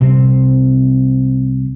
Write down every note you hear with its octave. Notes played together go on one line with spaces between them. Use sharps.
C2 C3 G3 C4